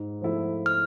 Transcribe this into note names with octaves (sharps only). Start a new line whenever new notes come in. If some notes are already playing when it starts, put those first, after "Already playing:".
Already playing: G#2
F3 A3 E4
F6